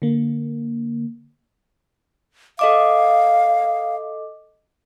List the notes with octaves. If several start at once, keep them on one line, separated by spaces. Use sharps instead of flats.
D3 A#3
A4 D#5 F5 D6